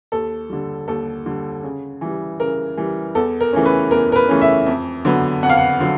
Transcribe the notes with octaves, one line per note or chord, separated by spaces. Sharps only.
D#2 A4
D3 G3
D#2 A4
D3 G3
C#3
E3 G3
C#3 A#4
E3 G3
E2 A4
A#4
C#3 E3 A3 C#4
B4
E2 A#4
A#4
B4
C#3 E3 A3 C#4
E5
F2
D3 F#3 B3
F2 F#5
F5
F#5
D3 F#3